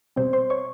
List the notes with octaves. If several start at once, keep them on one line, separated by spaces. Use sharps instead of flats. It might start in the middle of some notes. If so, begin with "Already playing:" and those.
B2 G3 C4 C5 C6
C5 C6
C#5 C#6